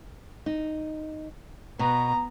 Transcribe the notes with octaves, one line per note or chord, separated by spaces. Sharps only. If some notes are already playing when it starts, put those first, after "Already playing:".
D#4
B2 B3 A#5